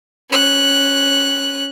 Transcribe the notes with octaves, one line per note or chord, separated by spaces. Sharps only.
C#4 F#6